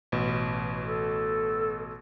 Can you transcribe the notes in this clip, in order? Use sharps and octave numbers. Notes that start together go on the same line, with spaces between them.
A1 B2
A4